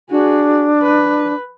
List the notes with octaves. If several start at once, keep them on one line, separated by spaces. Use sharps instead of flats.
D4 F#4 G#4
B4